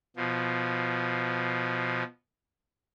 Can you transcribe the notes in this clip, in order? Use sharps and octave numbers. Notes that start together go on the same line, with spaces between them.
B2 F3